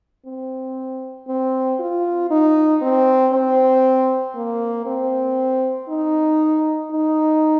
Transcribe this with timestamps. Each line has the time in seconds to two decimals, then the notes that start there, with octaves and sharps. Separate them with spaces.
0.26 C4
1.28 C4
1.80 F4
2.30 D#4
2.82 C4
3.33 C4
4.36 A#3
4.86 C4
5.89 D#4
6.91 D#4